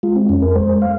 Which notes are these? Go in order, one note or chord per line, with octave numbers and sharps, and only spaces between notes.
G#3 F4
C4
F2 C#4
A#4
G#3 C5
F5